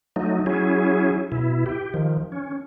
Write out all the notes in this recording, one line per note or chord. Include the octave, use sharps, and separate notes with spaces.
F#3 A3 D#4
F#3 C#4 E4 G#4
B2 E4
G4
D#3 F3
C#4